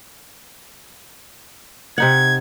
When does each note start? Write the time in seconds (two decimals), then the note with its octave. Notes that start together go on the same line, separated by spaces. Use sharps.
1.98 C3 D#4 F#5 G#6